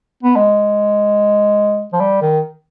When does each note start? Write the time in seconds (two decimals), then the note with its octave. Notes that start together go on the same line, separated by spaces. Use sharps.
0.23 B3
0.36 G#3
1.93 F3
2.00 G3
2.21 D#3